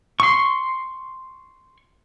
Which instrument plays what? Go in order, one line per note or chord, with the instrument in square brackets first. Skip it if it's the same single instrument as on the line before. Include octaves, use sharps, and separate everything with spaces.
[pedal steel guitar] C6 C#6